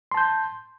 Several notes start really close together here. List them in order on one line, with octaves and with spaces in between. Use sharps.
C6 A5 G6